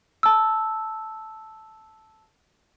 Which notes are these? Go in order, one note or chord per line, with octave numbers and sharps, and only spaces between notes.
A5 E6